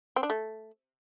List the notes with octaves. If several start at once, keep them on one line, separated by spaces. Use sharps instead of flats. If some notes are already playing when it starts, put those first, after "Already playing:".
C4
D4
A3